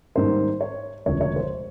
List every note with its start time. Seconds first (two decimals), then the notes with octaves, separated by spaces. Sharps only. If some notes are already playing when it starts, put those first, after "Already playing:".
0.15 G#2 D#3 G3 A#3 C5
0.61 C#5
1.06 E1 D2 C#3 F3 C#5
1.21 C#5
1.36 C5